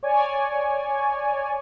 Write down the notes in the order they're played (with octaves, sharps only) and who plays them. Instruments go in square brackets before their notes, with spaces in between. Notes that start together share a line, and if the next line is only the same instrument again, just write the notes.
[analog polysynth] C#5 D5 G#5